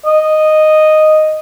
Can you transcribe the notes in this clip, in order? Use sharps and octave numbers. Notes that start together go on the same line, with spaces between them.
D#5